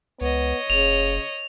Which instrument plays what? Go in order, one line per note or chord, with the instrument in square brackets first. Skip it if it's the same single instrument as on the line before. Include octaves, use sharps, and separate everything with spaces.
[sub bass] C#2 [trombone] B3 [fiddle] C#5 D#5
[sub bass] F#1 [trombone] C#3 [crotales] F7